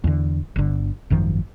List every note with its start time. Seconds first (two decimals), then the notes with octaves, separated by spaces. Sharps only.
0.04 E2 D3
0.56 G1 D3
1.10 G#1 F#2 D#3 F3